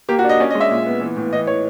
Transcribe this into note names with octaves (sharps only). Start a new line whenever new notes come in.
A#3 G4
F#4
D4
D#5
C#4 D5
D#5
G#3
E5
A#2
B3
E3
A2
E3 D#5
E3 C#5